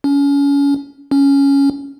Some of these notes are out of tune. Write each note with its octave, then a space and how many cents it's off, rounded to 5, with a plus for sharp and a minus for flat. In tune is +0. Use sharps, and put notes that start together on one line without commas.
C#4 +30
C#4 +5